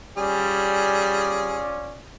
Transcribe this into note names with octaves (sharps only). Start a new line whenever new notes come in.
G3 C#4 F4 G#4 D5